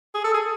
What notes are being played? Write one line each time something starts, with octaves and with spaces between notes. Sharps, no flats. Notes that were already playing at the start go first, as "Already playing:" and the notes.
G#4
A4
G#4